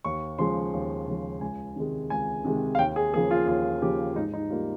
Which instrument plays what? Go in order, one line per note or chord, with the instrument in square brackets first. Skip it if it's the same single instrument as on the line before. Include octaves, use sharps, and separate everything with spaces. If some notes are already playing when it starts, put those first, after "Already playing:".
[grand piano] D#2 C#6
C#3 F3 G#3 C6
D#2
C#3 F3 G#3
C#2 G#5
C3 D#3 G#3
C#2 G#5
C3 D#3 G#3
F5
D#2 G5
G#4
C#3 F3 A#3 G#4
F4
D#2 F4
C#3 F3 A#3 G4
G#2 D#4
D#4
G3 F4
A#3